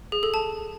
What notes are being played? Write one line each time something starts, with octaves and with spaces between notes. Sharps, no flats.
G#4
A4
A5